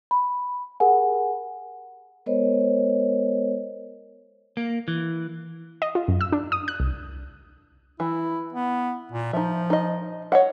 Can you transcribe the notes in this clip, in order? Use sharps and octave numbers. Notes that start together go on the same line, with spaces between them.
B5
G4 G#4 A#4 F#5 G#5
G#3 B3 A#4 C5 C#5 D#5
A#3
E3
D#5
F4
F#2
E6
D4
D#6
F#6
C2
E3 E4
B3
A#2
F3 D#4 E5
D#4 D#5
C#5 D#5 F#5